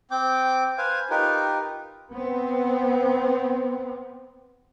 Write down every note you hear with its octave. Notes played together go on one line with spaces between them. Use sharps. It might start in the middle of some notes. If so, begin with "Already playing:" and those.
C4 G5 D6
B4 C5 F5 G#5
D#4 F4 G4 A#4 B4
B3 C4